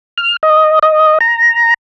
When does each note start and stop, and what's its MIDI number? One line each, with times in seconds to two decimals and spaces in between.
0.18 0.36 89
0.43 0.79 75
0.83 1.18 75
1.21 1.74 82